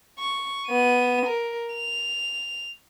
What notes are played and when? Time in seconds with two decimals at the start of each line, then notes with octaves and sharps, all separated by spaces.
0.19 C#6
0.68 B3 D#7
1.26 A#4
1.75 F7